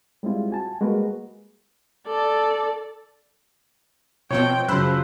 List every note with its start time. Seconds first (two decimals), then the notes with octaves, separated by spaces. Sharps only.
0.23 G3 G#3 C4 E4 F4
0.51 F#4 G#5 A5
0.81 G3 G#3 A#3 F#4 A#4 B4
2.06 A4 D5
4.31 B2 F3 C4 C#5 G5
4.68 F#2 C#3 F3 F#3 C5 B5 E6 F#6